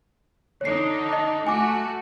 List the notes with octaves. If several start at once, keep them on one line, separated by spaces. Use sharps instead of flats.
D3 D4 D#4 C#5 C7
D#5 A5
A3 F#4 G#5 D6